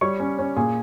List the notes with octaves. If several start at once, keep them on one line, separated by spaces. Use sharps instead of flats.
G3 C#5 C#6
C#4
C#4
A#2 G#4 G#5